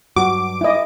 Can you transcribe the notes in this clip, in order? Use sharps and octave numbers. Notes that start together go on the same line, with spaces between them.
G2 F#3 F#4 D6
E4 D#5